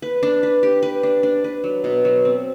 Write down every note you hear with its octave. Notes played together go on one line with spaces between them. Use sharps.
B4
D4
B4
G4
B4
D4
D4
B4
F#3
B2
F#3
C4